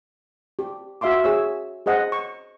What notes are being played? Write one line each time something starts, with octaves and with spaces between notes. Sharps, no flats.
G4
F#4 E5 F5 C6 D6
G#4 C#5 E6
G#4 C5 D#5 F#5
C#6